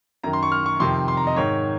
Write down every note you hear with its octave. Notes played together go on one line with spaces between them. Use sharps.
F#2 D#3 A#5
C6
C#6
F6
C#6
F2 C3 D#3 C6
C6
A#5
D#5
G#2 D#3 C#5